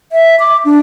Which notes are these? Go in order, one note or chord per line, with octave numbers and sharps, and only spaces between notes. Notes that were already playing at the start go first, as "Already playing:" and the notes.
E5
D6
D4